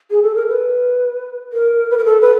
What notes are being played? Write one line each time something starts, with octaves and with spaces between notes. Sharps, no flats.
G#4
A4
A#4
B4
A#4
B4
A#4
A4
B4